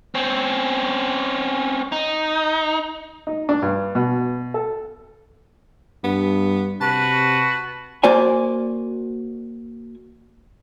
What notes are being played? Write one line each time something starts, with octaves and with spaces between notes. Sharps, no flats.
C4 C#4
D#4
D#4
D4
G2
B2
A4
G2 B3
C3 F#4 B4 A5
A#3 F#4 C5 D5 G#5